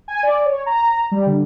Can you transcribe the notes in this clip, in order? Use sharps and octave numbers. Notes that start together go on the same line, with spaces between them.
G#5
D5
C#5
A#5
A#5
G3
D3